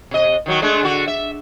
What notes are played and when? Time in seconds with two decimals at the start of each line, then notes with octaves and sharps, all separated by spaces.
0.11 C3 D#5
0.46 D#3 F#3 F#4
0.62 G#3 A3 D4
0.83 D3 F#4
1.08 E5